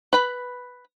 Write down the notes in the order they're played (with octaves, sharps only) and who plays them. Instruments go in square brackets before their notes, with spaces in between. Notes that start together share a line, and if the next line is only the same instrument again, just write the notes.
[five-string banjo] B4 B5